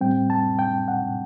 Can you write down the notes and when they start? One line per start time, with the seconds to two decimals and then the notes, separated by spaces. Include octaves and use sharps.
0.01 A2 G3 C4 G5
0.30 A5
0.59 G5
0.88 F#5